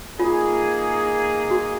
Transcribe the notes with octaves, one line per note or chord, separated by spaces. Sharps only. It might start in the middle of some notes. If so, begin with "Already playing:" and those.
A#3 D#4 F4 G#4
F#4